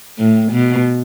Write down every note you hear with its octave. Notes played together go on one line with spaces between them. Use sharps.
A2
B2